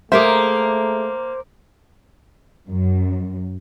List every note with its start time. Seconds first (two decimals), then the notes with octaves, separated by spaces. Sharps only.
0.12 A3 A#3 G#4 A#4 C5 E5 D6
2.68 F#2